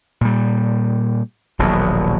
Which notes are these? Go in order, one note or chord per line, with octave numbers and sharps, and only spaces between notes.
A#2 G3
D#1 A#1 B2 F#3